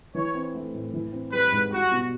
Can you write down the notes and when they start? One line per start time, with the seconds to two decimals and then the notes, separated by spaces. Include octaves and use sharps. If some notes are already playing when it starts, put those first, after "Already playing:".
0.14 E3 C#5
0.35 C4
0.54 A3
0.74 A2
0.93 E3
1.12 C4
1.32 G3 B4
1.52 G#2
1.72 G3 F#4
1.91 B2